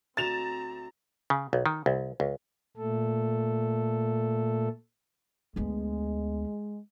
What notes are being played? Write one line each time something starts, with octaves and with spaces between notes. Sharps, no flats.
D2 C4 A#5 A6 E7 F7
C#3
B1
D#3
C2
C#2
A#2 A3 A4
D2 G#3 B3